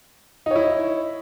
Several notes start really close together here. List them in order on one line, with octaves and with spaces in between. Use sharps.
D#4 C#5 E4